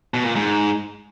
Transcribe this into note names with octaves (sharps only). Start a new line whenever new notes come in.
B2
A#2
G#2